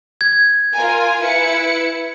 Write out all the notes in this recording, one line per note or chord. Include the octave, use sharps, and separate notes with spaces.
G#6
F4 A#4 G#5
E4 B4 C#7